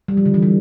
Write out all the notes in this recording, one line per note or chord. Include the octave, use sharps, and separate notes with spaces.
G3
F3
D3
E3
G3